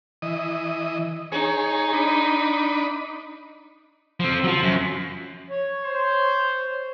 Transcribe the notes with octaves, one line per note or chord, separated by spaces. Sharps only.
E3 D#5
D#4 G#4 C#5
D4 D#5 B5
F3 C4
F3 F#3
F#2
C#5
C5